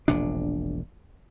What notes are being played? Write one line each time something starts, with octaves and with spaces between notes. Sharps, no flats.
E1 A#1 C3 D4